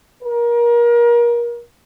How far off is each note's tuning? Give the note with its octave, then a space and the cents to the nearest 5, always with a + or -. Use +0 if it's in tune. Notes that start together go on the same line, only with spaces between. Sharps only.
A#4 +30